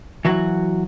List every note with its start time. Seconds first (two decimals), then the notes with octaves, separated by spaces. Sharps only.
0.25 E3 F#3 F#4